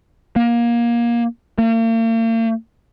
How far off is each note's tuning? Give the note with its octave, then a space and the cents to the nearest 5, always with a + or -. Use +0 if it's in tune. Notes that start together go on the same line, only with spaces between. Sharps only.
A#3 +20
A#3 -45